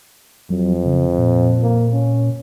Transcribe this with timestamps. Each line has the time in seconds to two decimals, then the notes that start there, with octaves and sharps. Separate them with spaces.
0.50 F2 F#3
0.86 C#3
1.18 A#2
1.62 A#3
1.93 C#4